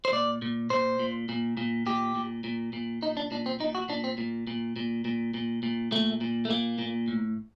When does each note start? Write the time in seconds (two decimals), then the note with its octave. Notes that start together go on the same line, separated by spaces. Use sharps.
0.05 C5
0.12 A#2 D5
0.42 A#2
0.70 A#2 C5
0.99 A#2
1.29 A#2
1.57 A#2
1.86 A#2 G4
2.15 A#2
2.44 A#2
2.73 A#2
3.02 A#2 D#4
3.17 D4
3.31 A#2 D4
3.46 C4
3.60 A#2 D#4
3.75 F#4
3.89 A#2 D4
4.04 C4
4.18 A#2
4.47 A#2
4.76 A#2
5.05 A#2
5.34 A#2
5.63 A#2
5.92 A#2 A3
6.21 A#2
6.45 A3
6.50 A#2 A#3
6.79 A#2
7.08 A2